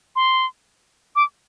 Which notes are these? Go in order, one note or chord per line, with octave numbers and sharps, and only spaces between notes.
C6
D6